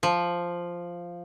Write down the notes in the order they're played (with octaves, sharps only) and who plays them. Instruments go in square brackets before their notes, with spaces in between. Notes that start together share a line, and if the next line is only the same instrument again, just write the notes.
[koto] F3